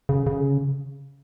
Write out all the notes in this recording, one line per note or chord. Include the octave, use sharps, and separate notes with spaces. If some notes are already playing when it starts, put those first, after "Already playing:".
C#3
C#3